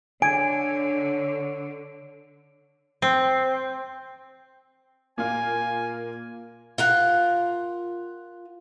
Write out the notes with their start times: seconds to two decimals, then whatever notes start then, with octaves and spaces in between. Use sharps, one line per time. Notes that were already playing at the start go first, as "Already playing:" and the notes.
0.22 D3 C#5 G#5 D7
3.02 C4
5.18 A#2 A#3 F4 G#5
6.78 F4 A#4 F#5